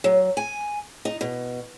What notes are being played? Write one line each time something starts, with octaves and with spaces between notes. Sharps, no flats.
F#3
G#5
D#4
B2